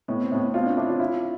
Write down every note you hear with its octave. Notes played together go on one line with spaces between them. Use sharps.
A2 B3
C4
A2 B3
B3
C4 F4
D4
D4 E4
F4
E4 F4